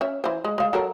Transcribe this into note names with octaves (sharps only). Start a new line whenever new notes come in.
C#4 E5
E3 C5
G#3
G#3 F5
F#3 A4 A#4